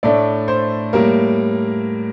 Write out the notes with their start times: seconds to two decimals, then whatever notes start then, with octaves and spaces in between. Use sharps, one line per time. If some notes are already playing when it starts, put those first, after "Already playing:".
0.03 A2 A3 D4 D5
0.48 C5
0.93 A2 G3 A#3 A#4